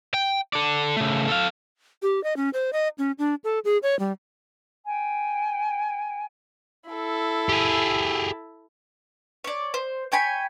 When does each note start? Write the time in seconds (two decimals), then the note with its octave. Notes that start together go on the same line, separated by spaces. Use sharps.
0.14 G5
0.53 A4 D5
0.96 C#3 A3
1.28 A4 F5
2.02 G4
2.24 D#5
2.37 C#4
2.53 C5
2.73 D#5
2.98 C#4
3.19 D4
3.44 A4
3.65 G#4
3.83 C#5
3.99 G3
4.86 G5 G#5
6.90 E4 A4
7.49 G4 G#4
9.44 C#5 D5
9.74 C5
10.12 C#5 G5 G#5 B5